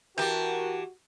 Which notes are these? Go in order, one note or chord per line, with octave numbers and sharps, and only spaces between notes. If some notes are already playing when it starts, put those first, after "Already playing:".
E3 F#4 G4 A#4 G5 A5